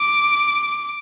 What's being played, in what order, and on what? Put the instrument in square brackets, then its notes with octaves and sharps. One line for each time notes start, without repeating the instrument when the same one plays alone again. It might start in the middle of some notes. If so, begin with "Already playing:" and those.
Already playing: [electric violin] D6